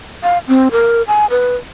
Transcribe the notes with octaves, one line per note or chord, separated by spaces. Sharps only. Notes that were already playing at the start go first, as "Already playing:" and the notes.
F5
C4
A#4
G#5
B4